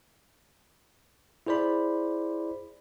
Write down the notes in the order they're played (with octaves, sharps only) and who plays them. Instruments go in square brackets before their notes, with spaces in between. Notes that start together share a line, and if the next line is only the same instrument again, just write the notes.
[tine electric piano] E4 G#4 C5 D5 B5